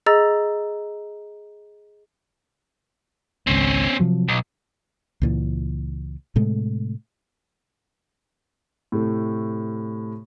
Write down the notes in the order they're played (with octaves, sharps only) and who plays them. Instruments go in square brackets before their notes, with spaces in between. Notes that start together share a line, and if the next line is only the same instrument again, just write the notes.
[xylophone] G#4 D#5 A#5 E6 A6
[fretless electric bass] G#1 C#2 [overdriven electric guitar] C4 C#4
[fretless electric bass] C3 F3 F#3
[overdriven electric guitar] B1
[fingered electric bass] C#2 A#2 E3
A2 C3 G#3 A3
[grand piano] A2 C3 A3